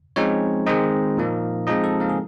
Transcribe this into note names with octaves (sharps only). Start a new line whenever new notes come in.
F3 G#3 C4 C#4 D#4 C#5
D#3 G#3 C4 D#4 D#5
A#2 F3 A#3
F3 G#3 C4 D#4 D#5
A4
A#3 A#4
G#4